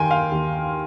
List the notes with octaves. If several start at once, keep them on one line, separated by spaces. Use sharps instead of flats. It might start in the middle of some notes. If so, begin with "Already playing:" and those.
Already playing: D#2 D#3 G5 G#5 C6
F5
D#2